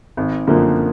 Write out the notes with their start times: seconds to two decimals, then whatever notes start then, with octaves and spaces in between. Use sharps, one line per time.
0.17 G#1
0.47 F#2 D3 F3 A#3